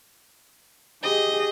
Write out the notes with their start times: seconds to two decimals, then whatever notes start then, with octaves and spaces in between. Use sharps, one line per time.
1.03 G4 G#4 D#5